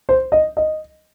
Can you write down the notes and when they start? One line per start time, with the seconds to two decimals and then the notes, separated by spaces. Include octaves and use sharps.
0.09 C5
0.32 D#5
0.57 D#5